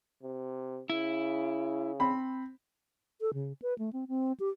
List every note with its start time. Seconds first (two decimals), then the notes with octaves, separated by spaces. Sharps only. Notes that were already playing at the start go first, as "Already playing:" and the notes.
0.23 C3
0.90 C#3 E4
2.00 C4 B5
3.21 A4
3.34 C#3
3.62 B4
3.79 A3
3.93 C4
4.08 C4
4.40 G4